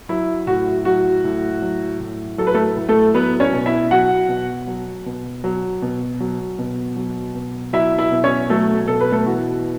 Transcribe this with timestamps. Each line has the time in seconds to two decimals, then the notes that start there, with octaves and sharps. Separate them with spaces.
0.09 F#3 E4
0.47 A2 F#4
0.85 F#3 F#4
1.24 A2
1.62 F#3
2.00 A2
2.38 F#3 A4
2.47 B4
2.54 A3 A4
2.76 A2
2.89 A3 A4
3.14 F#3 B3 B4
3.40 C#4 C#5
3.53 B2
3.66 E4 E5
3.91 F#3 F#4 F#5
4.29 B2
4.67 F#3
5.06 B2
5.44 F#3
5.82 B2
6.20 F#3
6.59 B2
6.97 F#3
7.35 B2
7.73 F#3 E4 E5
7.98 E4 E5
8.12 B2
8.24 C#4 C#5
8.50 F#3 A3 A4
8.87 B2 A4
9.01 B4
9.12 A3 A4
9.26 E3 F#4